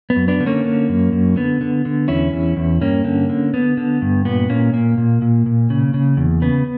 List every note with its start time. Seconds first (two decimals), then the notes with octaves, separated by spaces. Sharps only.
0.10 B3
0.16 F#2
0.28 B3 D4
0.40 D3
0.46 A#3 C#4
0.65 D3
0.89 F#2
1.12 F#2
1.36 D3 B3
1.61 D3
1.85 D3
2.08 E2 C#4 E4
2.33 E2
2.57 E2
2.81 G2 A#3 C#4
3.04 D3
3.29 D3
3.54 D3 B3
3.77 D3
4.02 G2
4.25 A#2 B3
4.50 A#2 A#3 C#4
4.73 A#2 A#3
4.98 A#2
5.22 A#2
5.46 A#2
5.70 C#3
5.94 C#3
6.17 E2
6.42 C#3 B3